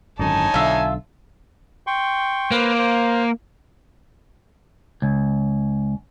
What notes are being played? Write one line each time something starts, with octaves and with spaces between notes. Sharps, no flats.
G#1 F#2 D3 D#4 C#5 G#5 A5
B1 D3 F4 E5
G5 C6 C#6
A#3 B4 C5
C5
C#2